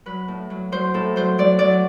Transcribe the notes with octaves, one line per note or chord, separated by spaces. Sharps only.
F#3 B4
A2
F#3
F#3 C5
A2 A4
F#3 C5
F#3 D5
F#3 D5